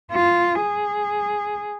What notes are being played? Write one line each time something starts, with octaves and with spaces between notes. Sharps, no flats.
F4
G#4